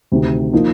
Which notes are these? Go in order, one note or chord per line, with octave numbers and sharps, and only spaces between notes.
D2 C3 D#3
F3 A#3 D#4